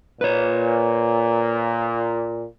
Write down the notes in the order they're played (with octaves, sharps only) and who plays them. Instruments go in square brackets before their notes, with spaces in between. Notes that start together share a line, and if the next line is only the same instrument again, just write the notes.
[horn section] A#2 [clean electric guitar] B4 C#5